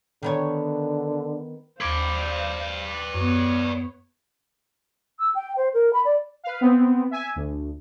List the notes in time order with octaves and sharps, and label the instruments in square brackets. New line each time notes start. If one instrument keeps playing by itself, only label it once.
[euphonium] D3 [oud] D#3 B3 C#5
[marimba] D#2 G#6 [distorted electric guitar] B4 D5 [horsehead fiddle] C5 F5
[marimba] F#2 [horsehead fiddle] B3 C#5
[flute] E6
G5
C5
A#4
B5
D5
[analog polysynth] B4 F5
B3 C4
E5 G#5
D2